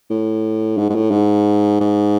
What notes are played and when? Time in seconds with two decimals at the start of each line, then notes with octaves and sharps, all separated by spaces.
0.10 A2
0.78 G#2
0.89 G#2
0.95 A2
1.11 G#2
1.80 G#2